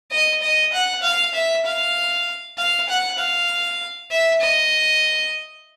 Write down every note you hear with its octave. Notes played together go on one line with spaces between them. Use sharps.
D#5
D#5
F#5
F5
E5
F5
F5
F#5
F5
E5
D#5